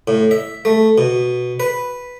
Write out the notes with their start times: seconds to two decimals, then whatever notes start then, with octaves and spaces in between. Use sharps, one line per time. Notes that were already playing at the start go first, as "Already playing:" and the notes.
0.08 A2
0.31 E5
0.65 A3
0.98 B2
1.60 B4